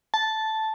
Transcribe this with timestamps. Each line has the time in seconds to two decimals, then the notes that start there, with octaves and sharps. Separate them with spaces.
0.14 A5